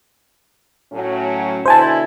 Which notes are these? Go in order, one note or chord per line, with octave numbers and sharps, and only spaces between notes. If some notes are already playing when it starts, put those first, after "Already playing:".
A2 F#3 C#4
B2 D3 E4 C5 G#5 A5